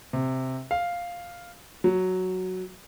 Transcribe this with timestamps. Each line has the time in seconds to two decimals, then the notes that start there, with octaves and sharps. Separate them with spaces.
0.13 C3
0.71 F5
1.84 F#3